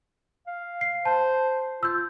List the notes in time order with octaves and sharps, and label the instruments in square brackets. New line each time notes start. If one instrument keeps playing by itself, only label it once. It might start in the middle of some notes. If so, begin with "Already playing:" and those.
[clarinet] F5
[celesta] C7
[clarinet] C5 [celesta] A5
[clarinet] F4 [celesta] E6 G6